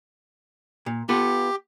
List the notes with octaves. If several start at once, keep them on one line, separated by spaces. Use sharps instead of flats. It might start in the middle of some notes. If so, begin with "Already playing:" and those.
A#2
B3 F4 G4 A4